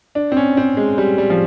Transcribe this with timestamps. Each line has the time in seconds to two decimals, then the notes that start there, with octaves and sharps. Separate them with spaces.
0.15 D4
0.32 C4
0.37 C#4
0.57 C4
0.77 G#3
0.98 G3
1.18 G3
1.30 F3